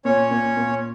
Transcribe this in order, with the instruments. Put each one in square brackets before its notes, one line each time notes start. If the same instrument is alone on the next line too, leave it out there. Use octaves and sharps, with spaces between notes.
[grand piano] A#2 [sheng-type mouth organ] C#4 C#5
[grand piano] A#2
A#2